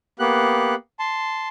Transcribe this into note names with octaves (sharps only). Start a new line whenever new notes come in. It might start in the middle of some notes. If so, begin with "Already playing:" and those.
A#3 B3 G4 F#6
A5 C6